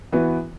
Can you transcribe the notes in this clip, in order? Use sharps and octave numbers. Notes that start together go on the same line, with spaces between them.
E3 B3 F#4 B4